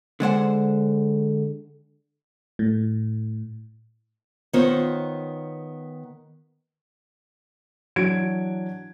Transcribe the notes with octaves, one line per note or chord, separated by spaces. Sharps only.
D3 G#3 C5 F#5
A2
D#3 B3 F4 C5 C#5
E3 F#3 D4 F#4 G#6 D7